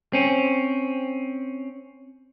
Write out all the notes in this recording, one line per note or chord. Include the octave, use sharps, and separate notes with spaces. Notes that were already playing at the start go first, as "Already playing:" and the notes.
C4 C#4